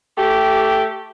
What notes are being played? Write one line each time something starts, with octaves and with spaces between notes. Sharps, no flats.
A3 G4